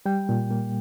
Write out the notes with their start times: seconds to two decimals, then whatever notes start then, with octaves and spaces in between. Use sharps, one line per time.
0.06 G3 G5
0.29 A#2
0.51 A#3